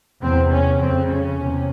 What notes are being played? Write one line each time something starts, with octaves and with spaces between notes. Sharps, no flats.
E2 C3 C4
C#4
F2 C#3 C4
C#4
E2 C3